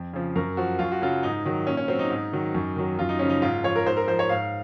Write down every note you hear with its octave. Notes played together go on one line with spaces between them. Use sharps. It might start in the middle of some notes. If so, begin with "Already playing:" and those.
Already playing: F2
C#3 F3
F#2 A#4
F3 F#4
F#2 F4
F#4
C#3 F#3 F4
G#2 D#4
D#3 F#3
A#2 C#4
C#4
F#3 C4
D#4
G#2
D#3 F#3
F#2
D#3 F#3
F#2 F4
D#4
C#3 F3 C#4
D#4
G#2 F4
F3 C#5
A#4
G#2 C5
A#4
F3 C5
C#5
G#2 F5